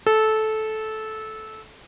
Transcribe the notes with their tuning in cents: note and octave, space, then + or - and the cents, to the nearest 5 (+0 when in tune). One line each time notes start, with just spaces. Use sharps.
A4 -15